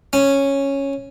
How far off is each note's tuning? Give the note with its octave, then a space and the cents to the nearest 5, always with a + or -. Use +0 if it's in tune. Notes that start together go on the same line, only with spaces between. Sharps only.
C#4 -5